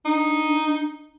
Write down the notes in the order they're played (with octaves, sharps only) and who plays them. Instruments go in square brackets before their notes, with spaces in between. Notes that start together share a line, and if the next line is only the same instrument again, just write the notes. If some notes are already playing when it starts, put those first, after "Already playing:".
[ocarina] D4 [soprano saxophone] D#4